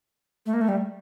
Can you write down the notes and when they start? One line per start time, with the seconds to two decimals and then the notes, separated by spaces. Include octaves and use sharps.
0.46 A3
0.54 A#3
0.61 A3
0.69 G3